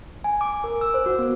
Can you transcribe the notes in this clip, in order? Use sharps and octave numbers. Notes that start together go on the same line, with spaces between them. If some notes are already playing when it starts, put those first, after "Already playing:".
G#5
D6
A#4
E6
C5
F#4
B3